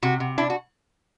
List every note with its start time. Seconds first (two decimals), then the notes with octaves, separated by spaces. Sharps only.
0.02 C3 F#4
0.20 C3
0.38 D4 E4
0.50 F#4